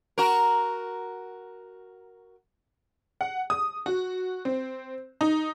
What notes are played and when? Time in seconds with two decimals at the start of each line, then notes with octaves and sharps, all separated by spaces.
0.18 F#4 A#4
3.21 F#5
3.50 D#6
3.86 F#4
4.45 C4
5.21 D#4